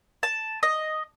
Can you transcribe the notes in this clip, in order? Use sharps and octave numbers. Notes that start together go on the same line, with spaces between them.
A5
D#5